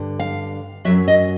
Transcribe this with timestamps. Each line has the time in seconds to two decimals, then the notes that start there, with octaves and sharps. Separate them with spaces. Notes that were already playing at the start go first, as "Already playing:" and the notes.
Already playing: G2 D3
0.19 F5
0.85 F#2 D#3 F#3 E5
1.08 D#5